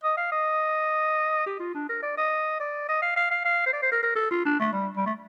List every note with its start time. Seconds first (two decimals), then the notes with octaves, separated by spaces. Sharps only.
0.04 D#5
0.17 F5
0.32 D#5
1.46 G4
1.60 F4
1.75 D4
1.89 A#4
2.02 D5
2.18 D#5
2.60 D5
2.89 D#5
3.02 F5
3.16 F5
3.31 F5
3.45 F5
3.66 C5
3.73 D5
3.82 C5
3.92 A#4
4.03 A#4
4.16 A4
4.31 F4
4.45 D4
4.60 A3
4.73 G3
4.97 G3
5.06 A3